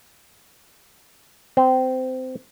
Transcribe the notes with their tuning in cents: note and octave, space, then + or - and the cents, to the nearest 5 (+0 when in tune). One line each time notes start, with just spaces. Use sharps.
C4 -20